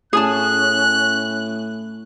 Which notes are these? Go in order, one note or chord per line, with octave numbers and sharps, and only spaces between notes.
A2 C#4 G#4 G#5 A5 F#6